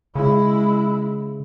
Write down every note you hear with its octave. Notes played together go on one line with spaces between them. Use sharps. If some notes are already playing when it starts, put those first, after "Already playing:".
C#3 G#3 E4